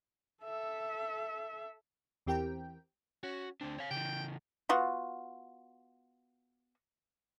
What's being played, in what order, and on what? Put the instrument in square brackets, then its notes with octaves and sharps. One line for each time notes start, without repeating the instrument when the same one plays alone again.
[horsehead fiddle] A4 E5
[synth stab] E2 E3 C4 G4 A#4 G5
[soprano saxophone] C#4 [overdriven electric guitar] F#4
[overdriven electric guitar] D2 D4 [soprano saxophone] C4
[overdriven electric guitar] C#5 F5
[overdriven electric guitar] C#3 E3 [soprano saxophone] G5
[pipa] B3 F4 F#4